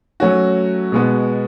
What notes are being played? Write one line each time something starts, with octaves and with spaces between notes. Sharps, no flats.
F#3 A3 C#4 F#4
B2 G#3 B3 F#4